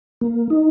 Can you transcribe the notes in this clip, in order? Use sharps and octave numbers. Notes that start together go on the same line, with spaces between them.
A#3
D#4